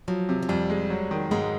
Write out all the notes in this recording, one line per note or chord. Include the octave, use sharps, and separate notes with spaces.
F3 F#3
C3
F#3
F2 G3
G#3
F#3
D#3
G#2 G#3